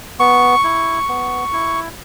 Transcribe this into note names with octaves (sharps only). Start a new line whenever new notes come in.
B3 C#6
E4
B3
E4